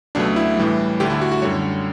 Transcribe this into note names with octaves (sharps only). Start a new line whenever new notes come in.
C#2 B2 F#3 A3 D4
E4
A2 E3 G3
D2 D3 A3 G4
E4
F#4
F#4
F#2 D3 G3 C#5